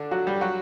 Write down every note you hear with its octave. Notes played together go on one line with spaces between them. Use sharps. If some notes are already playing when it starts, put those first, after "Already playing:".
Already playing: D3 D4
F#3 F#4
G3 G4
F#3 F#4